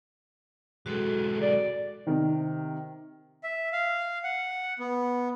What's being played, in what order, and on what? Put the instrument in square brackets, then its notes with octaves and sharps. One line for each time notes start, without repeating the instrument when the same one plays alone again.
[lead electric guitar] B1 G#3 [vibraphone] F#4 A4
[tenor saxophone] D5
[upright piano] C3 D#3
[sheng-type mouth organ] E5
F5
F#5
B3